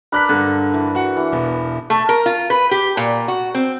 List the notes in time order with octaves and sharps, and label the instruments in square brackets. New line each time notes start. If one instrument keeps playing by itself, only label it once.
[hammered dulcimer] D4 A#4 B4 [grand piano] B5 F#6 B6
[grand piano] G2 [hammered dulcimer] D3
[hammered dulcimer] E3
[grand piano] F#4 F#5
[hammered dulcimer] E3
[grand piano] E1 B3
[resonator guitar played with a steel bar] A3
A#4
F4
B4
G4
A#2
F#4
C4